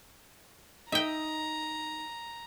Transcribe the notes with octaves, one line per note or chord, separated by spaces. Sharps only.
D#4 D#5 E5 G5 A#5